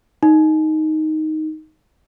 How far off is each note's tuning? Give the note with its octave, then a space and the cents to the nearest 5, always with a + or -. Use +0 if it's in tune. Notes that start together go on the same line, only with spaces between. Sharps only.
D#4 +5